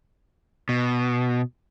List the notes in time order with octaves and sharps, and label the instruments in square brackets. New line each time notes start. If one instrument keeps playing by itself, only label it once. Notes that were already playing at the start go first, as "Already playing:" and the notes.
[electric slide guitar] B2